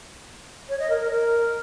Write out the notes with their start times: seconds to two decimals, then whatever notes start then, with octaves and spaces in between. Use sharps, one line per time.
0.69 C#5
0.79 D#5
0.90 A#4
1.00 A#4
1.11 A#4